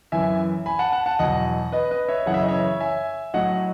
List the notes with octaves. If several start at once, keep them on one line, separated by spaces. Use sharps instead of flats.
F#2 E3 E5 G#5
G#5 B5
F#5 A5
F#5 A5
F#5 A5
E2 B2 F#3 D#5 F#5
B4 D#5
B4 D#5
C#5 E5
F#2 C#3 E3 F#5
E5
D#5
C#5 E5
E5 G#5
A2 F#3 D#5 F#5